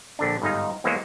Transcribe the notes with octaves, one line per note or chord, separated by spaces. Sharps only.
A#1 D3 D4
G1 G#2 D#4 D#5 F5
E2 E3 G#3 A#3 C5 C#5